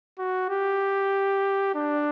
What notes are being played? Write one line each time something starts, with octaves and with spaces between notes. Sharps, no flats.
F#4
G4
D4